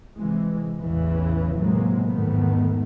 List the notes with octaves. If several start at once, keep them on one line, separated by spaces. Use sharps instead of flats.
C3 E3 G#3
A1 E2 C#3 E3
A2 C3 E3 F#3 G#3 A#3
E2 G#2 D#3 A3 B3